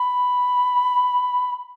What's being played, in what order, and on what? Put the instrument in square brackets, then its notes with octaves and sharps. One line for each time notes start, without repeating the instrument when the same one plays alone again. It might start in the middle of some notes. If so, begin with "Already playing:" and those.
Already playing: [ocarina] B5